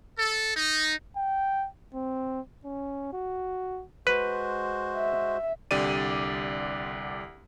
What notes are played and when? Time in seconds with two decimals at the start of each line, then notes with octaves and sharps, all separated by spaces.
0.18 A4
0.56 D#4
1.17 G5
1.94 C4
2.65 C#4
3.13 F#4
4.07 G#3 F#4 B4 C5
4.96 E5
5.71 C2 D3 G4 D5 D#7